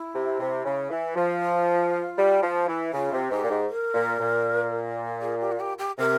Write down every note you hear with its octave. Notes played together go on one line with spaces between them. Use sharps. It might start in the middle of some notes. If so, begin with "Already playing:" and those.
Already playing: E4
C3
C3
C#3
E3
F3
F4
G3
F3
E3
C#3 F4
C3
G#2 G4
A#2
G#2
A#4
A#2
A#2
G#4
G4
F4
G4
G4
C3 A#4